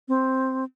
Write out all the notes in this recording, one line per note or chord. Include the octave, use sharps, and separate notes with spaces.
C4